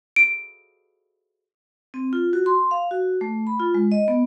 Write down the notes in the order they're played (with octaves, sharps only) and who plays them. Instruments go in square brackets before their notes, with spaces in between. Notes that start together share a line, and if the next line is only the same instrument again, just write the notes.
[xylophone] D7
[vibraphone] C4
F4
F#4
C6
F5
F#4
A3
B5
F4
G#3
D#5
B3